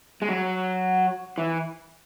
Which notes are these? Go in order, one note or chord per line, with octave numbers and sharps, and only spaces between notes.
G#3
F#3
E3